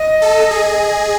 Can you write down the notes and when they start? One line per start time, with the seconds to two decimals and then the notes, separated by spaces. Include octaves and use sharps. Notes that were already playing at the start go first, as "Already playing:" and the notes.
Already playing: D#5
0.22 A4
0.51 G#4